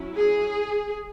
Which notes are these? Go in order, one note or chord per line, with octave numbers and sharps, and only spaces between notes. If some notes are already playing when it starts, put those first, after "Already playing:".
Already playing: F#3 C#4 E4
G#4